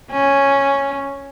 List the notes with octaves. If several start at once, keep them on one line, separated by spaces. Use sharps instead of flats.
C#4